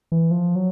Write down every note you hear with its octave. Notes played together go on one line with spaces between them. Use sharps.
E3
F3
F#3